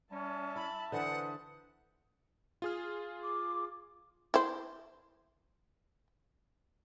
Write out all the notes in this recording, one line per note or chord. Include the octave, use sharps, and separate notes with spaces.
G3 C#4 E5 A5
E4 B5
D3 E3 B4 C5 F#5 D#6
F4 G#4 F6
D6
E4 C5